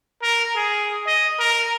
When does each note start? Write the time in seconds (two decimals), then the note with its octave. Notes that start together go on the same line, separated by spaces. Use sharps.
0.22 A#4
0.56 G#4
1.07 D#5
1.39 A#4